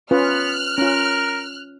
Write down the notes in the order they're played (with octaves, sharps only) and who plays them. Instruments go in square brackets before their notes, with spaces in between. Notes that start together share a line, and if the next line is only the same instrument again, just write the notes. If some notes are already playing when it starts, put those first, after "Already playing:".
[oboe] B3 [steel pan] C#4 F4 B4 [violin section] F6 F#6
[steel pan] C#4 F4 [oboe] A#4